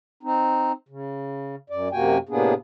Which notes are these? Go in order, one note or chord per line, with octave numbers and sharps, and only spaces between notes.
C4 D#4
C#3
F#2 D5
F#2 C3 A#3 F#4 G5 G#5
A2 C3 A#3 B3 D4 G#4